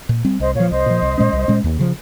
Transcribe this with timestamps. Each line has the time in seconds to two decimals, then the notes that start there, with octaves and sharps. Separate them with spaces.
0.09 A#2
0.25 G3 C4
0.40 C2 C5 D#5
0.55 A#2 F3 C#5 F5
0.71 C2 C5 D#5
0.86 A#2 F3
1.02 C2
1.18 A#2 G#3 C#4
1.33 C2
1.48 A#2 G#3 C#4
1.64 D#2
1.79 C#3 F3